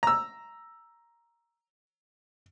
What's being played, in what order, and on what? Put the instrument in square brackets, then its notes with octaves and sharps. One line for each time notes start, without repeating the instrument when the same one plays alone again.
[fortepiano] A#5 E6